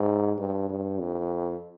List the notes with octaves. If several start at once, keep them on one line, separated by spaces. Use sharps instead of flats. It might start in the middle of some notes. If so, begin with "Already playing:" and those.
Already playing: G#2
G2
G2
F2